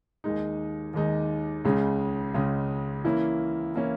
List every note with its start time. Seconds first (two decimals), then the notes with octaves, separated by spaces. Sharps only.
0.24 D#2 D#3 G#3 D#4
0.94 D#2 D#3 G#3 D#4
1.65 C#2 C#3 G#3
2.34 C#2 C#3 G#3
3.04 E3 A#3 C#4 E4
3.75 E3 A#3 C#4 E4